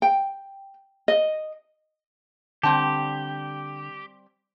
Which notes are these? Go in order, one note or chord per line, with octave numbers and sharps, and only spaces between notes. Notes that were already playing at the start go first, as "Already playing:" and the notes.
G5
D#5
D3 G3 C4 G4 A5